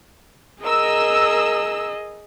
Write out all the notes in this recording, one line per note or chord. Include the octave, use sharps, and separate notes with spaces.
G#4 A#4 D#5 E6